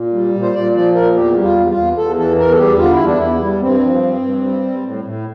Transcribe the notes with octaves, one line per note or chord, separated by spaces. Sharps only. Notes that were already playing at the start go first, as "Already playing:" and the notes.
Already playing: A#2
G3
A#2
C5
A#2 D5
F3 D5
A#2 A#4
E2 G4
G3
F4
E2
F4
E2
E2 A4
E3 A4
E2 A#4
A4
G3 G4
D3 F4
E4
E2
D4
E2 E4
G3
G2 C4
F3
G2
G2
G3
G3
A2
A2